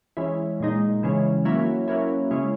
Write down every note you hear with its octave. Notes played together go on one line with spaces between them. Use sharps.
E3 G#3 C#4 E4
A#2 G#3 D#4
C#3 E3 G#3 C#4
F#3 A#3 C#4 E4
F#3 A#3 C#4 E4
C#3 G#3 C#4 E4